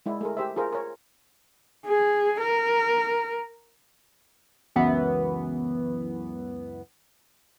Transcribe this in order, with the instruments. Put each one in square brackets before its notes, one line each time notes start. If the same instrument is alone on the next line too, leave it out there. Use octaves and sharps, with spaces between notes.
[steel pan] G#3 E4 D5
A3 G#4 A#4
G4 C5 E5
F4 G#4 A#4 C5
A#4 C#5
[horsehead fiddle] G#4
A#4
[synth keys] C#2 F#2 E3 B3